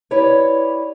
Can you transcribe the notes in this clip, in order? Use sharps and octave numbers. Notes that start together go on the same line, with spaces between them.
E4 G4 B4 C#5 D5